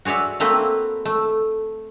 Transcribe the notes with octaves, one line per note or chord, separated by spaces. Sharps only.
F#4 G#4 C#5 D5 E5
A3 A#3 C4 B4 E5
A3